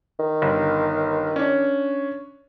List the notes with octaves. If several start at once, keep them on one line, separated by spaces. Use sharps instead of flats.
D#3
G1
C#4 D4